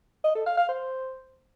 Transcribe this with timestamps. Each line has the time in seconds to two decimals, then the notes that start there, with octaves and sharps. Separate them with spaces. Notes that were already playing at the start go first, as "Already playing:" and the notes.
0.24 D#5
0.35 A4
0.46 F5
0.57 F5
0.68 C5